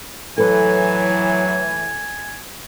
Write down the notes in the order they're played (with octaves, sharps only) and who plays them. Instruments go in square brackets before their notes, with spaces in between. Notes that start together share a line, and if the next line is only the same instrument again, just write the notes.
[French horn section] A2 E3 [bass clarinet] F#3 [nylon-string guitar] A4 B4 [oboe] G#5